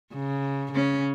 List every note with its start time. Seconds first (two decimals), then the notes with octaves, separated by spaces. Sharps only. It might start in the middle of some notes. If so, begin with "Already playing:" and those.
0.14 C#3
0.72 C#3 C#4